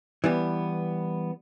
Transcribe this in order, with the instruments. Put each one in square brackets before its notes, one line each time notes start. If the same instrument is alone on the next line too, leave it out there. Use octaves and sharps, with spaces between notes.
[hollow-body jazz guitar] E3 G3 B3